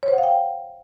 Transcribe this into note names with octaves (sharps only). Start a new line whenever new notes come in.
C#5
C5
F#5
F5
G5